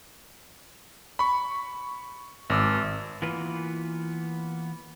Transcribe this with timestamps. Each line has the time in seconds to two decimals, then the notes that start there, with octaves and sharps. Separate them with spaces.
1.19 B5 C#6
2.50 G#1 D6 E6
3.22 E3 A#3 B3 F4 B4